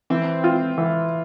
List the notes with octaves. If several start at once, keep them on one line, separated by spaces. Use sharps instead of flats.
E3 C4
F4
E3